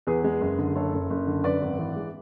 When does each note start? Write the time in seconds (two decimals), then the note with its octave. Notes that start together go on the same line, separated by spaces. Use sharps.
0.07 E2 G#4 B4
0.24 G#3
0.41 F#1
0.58 D3
0.76 F#1 A4 C#5
0.93 F#1
1.10 F#1
1.27 D3
1.44 F#2 B4 D5
1.61 G#1
1.79 E3
1.96 G#3